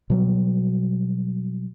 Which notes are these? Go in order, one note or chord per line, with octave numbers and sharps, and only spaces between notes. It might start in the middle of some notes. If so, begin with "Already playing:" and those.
B2 F#3 G3